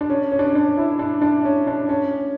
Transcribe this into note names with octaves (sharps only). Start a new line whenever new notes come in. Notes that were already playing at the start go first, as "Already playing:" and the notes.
D4
C#4
C#4
D4
C#4
D4
E4
D4
D4
C#4
D4
C#4